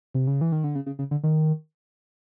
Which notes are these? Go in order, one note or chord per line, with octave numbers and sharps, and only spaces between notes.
C3
C#3
E3
D#3
D3
C#3
C#3
C#3
D3
D#3